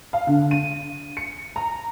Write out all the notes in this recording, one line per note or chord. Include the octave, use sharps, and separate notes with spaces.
F5
D3
D#7
C#7
A#5